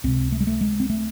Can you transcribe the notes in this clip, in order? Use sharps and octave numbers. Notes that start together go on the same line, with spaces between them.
C#2 C3 C4
A3
G#3
A3
G#3
C4
A3